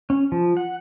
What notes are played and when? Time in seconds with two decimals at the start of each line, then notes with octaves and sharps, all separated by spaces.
0.10 C#4
0.32 F3
0.57 F#5